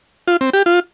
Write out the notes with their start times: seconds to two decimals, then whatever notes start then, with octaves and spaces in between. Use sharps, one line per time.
0.28 F4
0.41 C4
0.53 G4
0.66 F4